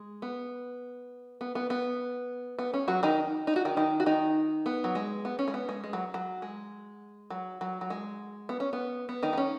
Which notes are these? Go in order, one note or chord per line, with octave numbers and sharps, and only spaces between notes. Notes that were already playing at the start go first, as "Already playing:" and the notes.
Already playing: G#3
B3
B3
B3
B3
B3
C#4
F#3 F#4
D#3 D#4
D#4
F#4
D#3 D#4
D#3 D#4
F#4
D#3 D#4
B3
F#3
G#3
B3
C#4
G#3
B3
G#3
G#3
F#3
F#3
G#3
F#3
F#3
F#3
G#3
B3
C#4
B3
B3
D#3 D#4
B3
C#4